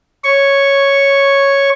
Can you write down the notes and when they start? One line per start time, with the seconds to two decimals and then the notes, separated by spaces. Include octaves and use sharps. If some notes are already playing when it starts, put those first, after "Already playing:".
0.24 C#5 C#6